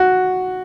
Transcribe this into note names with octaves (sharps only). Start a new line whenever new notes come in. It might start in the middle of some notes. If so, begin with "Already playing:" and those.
Already playing: F#4